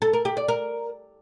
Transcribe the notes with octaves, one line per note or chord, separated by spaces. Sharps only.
A4
A#4
G4
D5
A#4